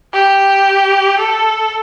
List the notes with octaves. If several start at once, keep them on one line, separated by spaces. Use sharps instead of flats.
G4
A4